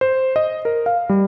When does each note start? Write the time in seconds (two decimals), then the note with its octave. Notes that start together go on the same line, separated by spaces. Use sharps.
0.01 C5
0.36 D#5
0.65 A#4
0.86 F5
1.09 G3